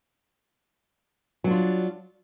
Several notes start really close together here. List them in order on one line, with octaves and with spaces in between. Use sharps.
F#3 D4 F4